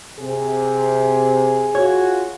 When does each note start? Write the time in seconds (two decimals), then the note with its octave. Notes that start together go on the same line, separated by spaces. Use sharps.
0.19 C3 G#4
1.75 F4 F#4 C#5